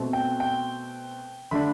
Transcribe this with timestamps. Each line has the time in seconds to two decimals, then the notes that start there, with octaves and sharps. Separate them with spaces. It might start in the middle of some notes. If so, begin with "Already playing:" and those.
Already playing: B2 A3 C4
0.13 G5
0.40 G5
1.51 D3 A3 D4 B5